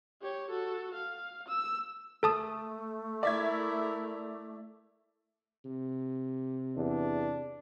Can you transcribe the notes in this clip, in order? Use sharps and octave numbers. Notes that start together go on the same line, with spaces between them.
G4 C#5
F#4 A4
F5
E6
A3 A4 A5 D#6
E4 A#4 D5 E5 G#6
C3
E2 D4